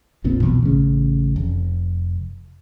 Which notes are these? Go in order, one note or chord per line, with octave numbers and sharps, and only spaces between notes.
F1 A#1 A#2 C4
B1 E2 B2
A1 C#3
F1